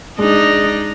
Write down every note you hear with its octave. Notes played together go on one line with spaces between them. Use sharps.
G#3 D4 D#4